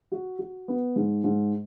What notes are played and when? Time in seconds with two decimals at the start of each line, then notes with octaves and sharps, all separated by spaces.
0.12 F#4
0.39 F#4
0.68 B3
0.96 G#2
1.24 G#2